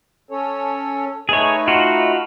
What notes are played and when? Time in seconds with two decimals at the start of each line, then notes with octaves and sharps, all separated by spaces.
0.31 C#4 A4 C#5
1.29 A3 D#4 G#4 B4 C#5
1.68 F4 F#4